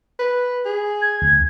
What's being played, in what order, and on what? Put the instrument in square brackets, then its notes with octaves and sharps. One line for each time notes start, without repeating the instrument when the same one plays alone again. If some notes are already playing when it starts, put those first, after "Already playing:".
[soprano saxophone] B4
G#4
[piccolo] G#6
[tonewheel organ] D2